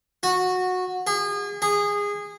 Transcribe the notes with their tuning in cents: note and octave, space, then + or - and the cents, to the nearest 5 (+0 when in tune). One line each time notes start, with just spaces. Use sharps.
F#4 -15
G#4 -35
G#4 -20